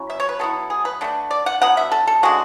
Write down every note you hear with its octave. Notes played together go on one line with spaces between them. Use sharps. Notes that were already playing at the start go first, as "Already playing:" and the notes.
Already playing: F#3 C#4 E4
E5
C#5
B4
F#3 B3 E4 A4
G#4
B4
D3 A3 D4
D5
F#5
D3 F#3 B3 F#5
E5
A4
A4
C#3 G#3 D4 F#4